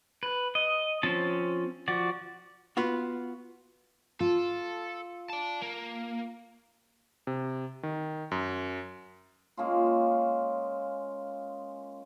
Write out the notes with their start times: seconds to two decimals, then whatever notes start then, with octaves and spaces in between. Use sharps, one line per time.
0.23 B4
0.55 D#5
1.03 F3 C4 C#4 A5
1.88 F3 F#4 D5
2.77 B3 F4 F#4
4.20 F4 A4
5.30 D5 A5
5.62 A#3
7.27 C3
7.83 D#3
8.31 F#2
9.57 G#3 A#3 C#4 F4